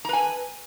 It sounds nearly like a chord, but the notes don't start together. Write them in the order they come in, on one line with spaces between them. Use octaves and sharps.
A#5 B4 G#5